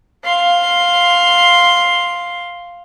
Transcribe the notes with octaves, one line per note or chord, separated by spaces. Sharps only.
F5 C6